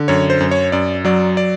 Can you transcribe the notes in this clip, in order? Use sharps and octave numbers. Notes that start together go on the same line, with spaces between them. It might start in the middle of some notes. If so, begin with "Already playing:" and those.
Already playing: D3
F#2 C#5
C5
F#2
C#5
F#2 D5
F#3 D5
D5